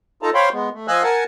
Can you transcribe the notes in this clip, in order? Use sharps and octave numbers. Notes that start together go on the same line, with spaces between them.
D#4 F4 A4 A5 A#5
C5 C#5 F5 G5 B5 C6
G#3 B3
A3
F3 D#5 F5 G#5 E6 F#6
A#4 F#5 G#5 A5